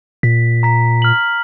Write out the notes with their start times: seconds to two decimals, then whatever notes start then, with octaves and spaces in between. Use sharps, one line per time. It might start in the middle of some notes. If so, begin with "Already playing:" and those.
0.23 A#2 B6
0.63 A#5 B6
1.02 F6 F#7